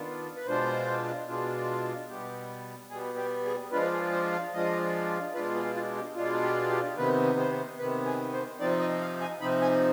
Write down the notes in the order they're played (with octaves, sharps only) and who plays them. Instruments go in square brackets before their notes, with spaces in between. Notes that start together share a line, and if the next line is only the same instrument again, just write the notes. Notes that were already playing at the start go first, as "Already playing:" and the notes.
Already playing: [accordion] D#3 B3 D4 F4
B4
B2 G#3 D4 F4 C5
B2 G#3 D4 F4
B2 G3 B3 G4
B2 G3 B3 G#4
G4
G#4
F3 G#3 D4 F4 B4
G#4
C5
F5
F3 G#3 D4 F4 D#5
B2 G#3 D4 F4 B4
G#4
F4
G4
B2 G#3 D4 F4
G4
G4
C3 D#3 B3 B4
C5
C3 D#3 B3 B4
G#4
C5
C3 F3 C4 D#4 D5
D#5
F5
G#5
C3 F3 C4 D#4 B5
G#5